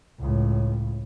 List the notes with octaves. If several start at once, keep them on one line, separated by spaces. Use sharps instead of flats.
C#2 A2